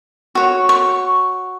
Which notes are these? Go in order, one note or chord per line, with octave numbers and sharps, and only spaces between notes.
F#4 C#5
C#6